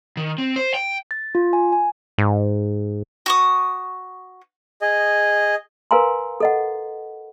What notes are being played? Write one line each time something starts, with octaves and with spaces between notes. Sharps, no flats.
D#3
C4
C5
G5
A6
F4
G#5
G#5
G#2
F#4 C#6 D#6
G#4 D#5
A#4 B4 F5 G#5 A#5 C6
A4 D#5 F#5